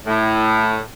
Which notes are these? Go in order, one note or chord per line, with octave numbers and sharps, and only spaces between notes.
A2